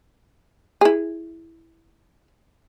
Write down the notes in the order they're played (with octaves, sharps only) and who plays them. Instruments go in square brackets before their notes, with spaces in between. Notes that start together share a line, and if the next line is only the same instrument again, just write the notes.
[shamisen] E4 G#4